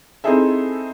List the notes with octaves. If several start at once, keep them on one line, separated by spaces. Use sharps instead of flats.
C4 D#4 E4 G#4 A4 E5